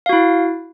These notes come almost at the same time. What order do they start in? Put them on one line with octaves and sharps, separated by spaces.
F5 F#4 E4